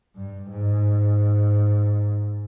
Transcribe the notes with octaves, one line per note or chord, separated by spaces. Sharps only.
G2
G#2